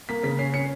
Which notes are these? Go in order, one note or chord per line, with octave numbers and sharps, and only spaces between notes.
A#3 B6
C#3 B6
C#4 C7
C#4 C#7